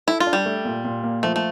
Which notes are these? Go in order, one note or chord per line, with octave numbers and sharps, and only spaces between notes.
E4 A4
F4
D4
G3
A3
A#2
A#2
A#3
F3 A3
A3